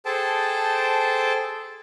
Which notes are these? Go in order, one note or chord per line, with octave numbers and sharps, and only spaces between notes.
G#4 A4 C5 G5 A5